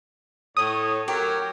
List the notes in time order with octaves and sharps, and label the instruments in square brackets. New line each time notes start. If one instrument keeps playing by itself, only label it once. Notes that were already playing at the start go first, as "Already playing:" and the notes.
[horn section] A2 C#5 [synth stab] D#6
[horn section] F#3 A#4 [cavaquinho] G4